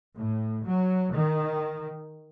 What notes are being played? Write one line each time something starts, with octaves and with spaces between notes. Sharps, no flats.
A2
F#3
D#3